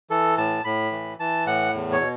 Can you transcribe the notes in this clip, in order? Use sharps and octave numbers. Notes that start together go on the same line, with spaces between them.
E3 A4
A2 A5
A2 B5
E3
E3 A5
A2 F#5
E2
C#5
B2